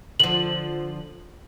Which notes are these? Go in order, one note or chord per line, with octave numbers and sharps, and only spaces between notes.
D3 F3 F#7